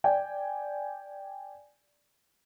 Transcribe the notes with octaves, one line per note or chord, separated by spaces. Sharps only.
D5 G5 G#5